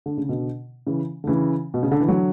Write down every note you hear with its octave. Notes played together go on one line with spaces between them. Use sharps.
D3
C#3
B2 D3
C#3 E3
D3
C#3 E3
B2
C#3
D3
E3
D3 F#3